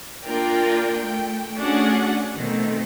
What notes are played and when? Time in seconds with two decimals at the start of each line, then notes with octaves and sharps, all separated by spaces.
0.24 A#3 D4 F4 A#4 D5 G5
0.96 A3 G5
1.56 A3 C#4 D4 F#4 G#4 F#5
2.36 B2 D#3 A3 C4